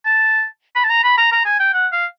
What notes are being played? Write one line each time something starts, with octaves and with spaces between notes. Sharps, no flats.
A5
B5
A5
A#5
B5
A#5
A#5
G#5
G5
F#5
F5